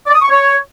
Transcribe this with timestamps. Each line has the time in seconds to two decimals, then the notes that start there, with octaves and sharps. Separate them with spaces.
0.06 D5
0.14 D#6
0.22 C#6
0.30 C#5